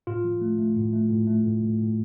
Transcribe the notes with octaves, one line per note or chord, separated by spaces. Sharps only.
A2 F4
F3
A3
A3
A2
A3
A2
A3
A2
A2
A2